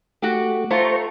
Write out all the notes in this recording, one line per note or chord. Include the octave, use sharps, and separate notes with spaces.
A3 F#4 G4
A3 F4 C5 A#5 C#6